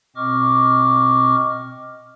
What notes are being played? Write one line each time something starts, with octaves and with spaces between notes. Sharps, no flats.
B2 C4 D#5 C#6 D6 F6